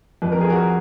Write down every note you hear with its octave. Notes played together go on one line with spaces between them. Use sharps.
F2 B4
A#4
G#4
F#4 A#4